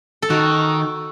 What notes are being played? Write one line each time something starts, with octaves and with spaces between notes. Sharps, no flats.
A4
D#3 F#4